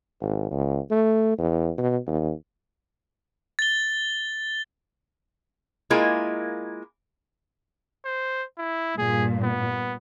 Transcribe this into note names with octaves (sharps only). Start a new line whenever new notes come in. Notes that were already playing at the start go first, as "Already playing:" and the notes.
G#1
C#2
A3
E2
B2
D#2
A6 G7
G#3 A#3 E4 F4 A#4 G#5
C5
E4
G2 A#2 G#4
B3